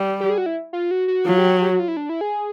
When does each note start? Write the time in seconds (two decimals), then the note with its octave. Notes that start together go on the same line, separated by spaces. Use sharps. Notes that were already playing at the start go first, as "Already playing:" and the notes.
Already playing: G3
0.20 G4
0.29 G#4
0.38 F#4
0.46 E4
0.73 F4
0.91 F#4
1.08 F#4
1.26 F#3 F4
1.38 G4
1.62 G4
1.70 F#4
1.79 F4
1.88 E4
1.97 D4
2.09 E4
2.21 G#4